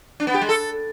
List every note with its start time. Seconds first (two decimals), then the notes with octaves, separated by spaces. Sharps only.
0.20 D4
0.27 B3
0.34 G4
0.41 G#3
0.49 A4